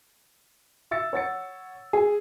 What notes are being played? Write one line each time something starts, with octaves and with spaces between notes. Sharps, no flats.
E5 E6 A6 C#7
C#5 F#5 A6 C#7
G#4